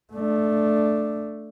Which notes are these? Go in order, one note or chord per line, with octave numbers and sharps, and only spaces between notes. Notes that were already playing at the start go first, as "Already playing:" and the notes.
A3 D4